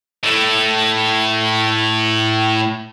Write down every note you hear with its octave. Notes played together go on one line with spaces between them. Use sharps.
A2 A3